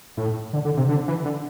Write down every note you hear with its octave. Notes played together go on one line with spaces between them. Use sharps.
A2
D3
D3
C3
D3
E3
D3